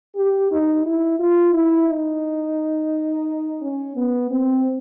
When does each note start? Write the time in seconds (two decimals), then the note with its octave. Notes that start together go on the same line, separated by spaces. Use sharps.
0.16 G4
0.51 D#4
0.86 E4
1.20 F4
1.53 E4
1.88 D#4
3.62 C#4
3.96 B3
4.31 C4